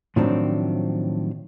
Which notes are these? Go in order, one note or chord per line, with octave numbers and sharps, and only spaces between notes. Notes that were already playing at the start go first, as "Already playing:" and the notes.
A2 D#3 F3 F#3 C4 D4